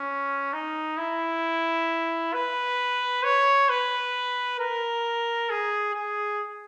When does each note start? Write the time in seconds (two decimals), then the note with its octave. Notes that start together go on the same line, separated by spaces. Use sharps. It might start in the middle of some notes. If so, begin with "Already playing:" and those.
Already playing: C#4
0.53 D#4
0.98 E4
2.33 B4
3.23 C#5
3.69 B4
4.59 A#4
5.50 G#4
5.94 G#4